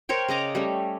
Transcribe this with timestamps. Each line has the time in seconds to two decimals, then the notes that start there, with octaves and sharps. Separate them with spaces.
0.09 A#4 C5 C#5 G5
0.28 C#3 D#5 A#5 D6
0.55 G3 A3 C#4